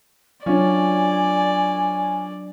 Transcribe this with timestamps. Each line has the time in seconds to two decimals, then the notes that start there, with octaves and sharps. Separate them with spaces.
0.46 F#3 C#4 D4 F4 D5 G#5